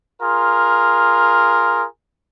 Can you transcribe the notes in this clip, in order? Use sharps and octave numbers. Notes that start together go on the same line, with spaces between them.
F4 G#4 A#4